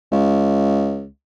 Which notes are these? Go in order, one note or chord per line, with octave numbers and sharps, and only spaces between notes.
C#2